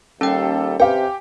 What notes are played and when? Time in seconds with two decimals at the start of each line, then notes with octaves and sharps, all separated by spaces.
0.21 D#2 G3 C#4 A4 G5
0.80 C3 G4 B4 F5 G5 G#5